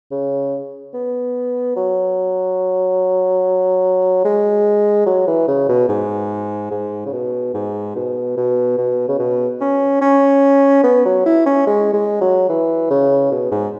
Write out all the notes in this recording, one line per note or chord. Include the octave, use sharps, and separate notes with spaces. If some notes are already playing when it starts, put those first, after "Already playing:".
C#3
B3
F#3
G#3
F#3
E3
C#3
B2
G#2
G#2
C#3
B2
G#2
B2
B2
B2
C#3
B2
C#4
C#4
B3
F#3
E4
C#4
G#3
G#3
F#3
E3
C#3
B2
G#2